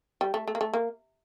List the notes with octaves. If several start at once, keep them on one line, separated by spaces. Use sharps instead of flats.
G3
A3
A3
A#3
A3
A#3